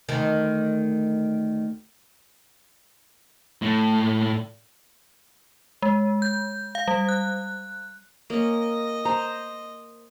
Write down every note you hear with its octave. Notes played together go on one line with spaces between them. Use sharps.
D2 D#3
A2 A3
G#3
G6
F5
G3
F#6
A#3 C#4 D#5
C5 A#5